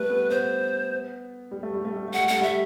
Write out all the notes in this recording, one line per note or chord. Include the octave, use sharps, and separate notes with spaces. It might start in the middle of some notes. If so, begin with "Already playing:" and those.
Already playing: G3 A3 B4
B3
B3 C5
G3
A3
G3
A3
G3
A3
F#5
G3
A3 F#5
G3 E5